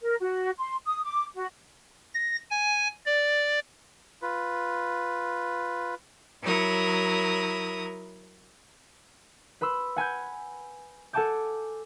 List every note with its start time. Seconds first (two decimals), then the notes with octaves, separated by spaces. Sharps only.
0.01 A#4
0.21 F#4
0.57 C6
0.85 D#6
1.04 D6
1.35 F#4
2.14 A#6
2.51 G#5
3.06 D5
4.22 F4 B4
6.42 F#3 E4 A#4 D#6
9.61 B4 B5 C6 E6
9.96 F#5 G#5 B5 G6
11.13 A4 F#5 G#5 A5 D6 G6